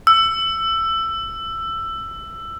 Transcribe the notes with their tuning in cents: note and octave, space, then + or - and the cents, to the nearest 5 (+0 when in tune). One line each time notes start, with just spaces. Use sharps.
E6 +15